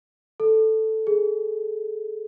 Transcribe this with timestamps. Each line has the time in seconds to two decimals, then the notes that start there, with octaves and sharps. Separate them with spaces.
0.40 A4
1.07 G#4